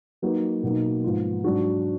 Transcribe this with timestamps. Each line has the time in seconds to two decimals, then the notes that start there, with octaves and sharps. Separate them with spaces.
0.22 F#3 A#3 D#4 F#4 B4
0.63 B2 F#3 A#3 D#4
1.04 G#2 F3 B3 F4
1.44 G#2 F#3 D4 F#4